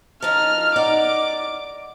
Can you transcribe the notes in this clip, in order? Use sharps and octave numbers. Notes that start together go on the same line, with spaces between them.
F3 D#4 F6
D#4 D5 F#5 D6